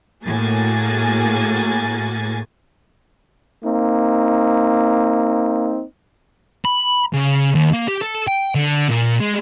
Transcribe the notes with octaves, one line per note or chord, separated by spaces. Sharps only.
A2 A#3 F#4 G#4 G#5 A6
A#3 C4 D#4
B5
C#3
D#2
A#3
G4
A4
G5
D3
A#2
G#3